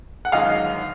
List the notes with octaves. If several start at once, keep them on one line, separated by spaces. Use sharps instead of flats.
F#5
G1 F#2 D#3 G#3 D#5 F5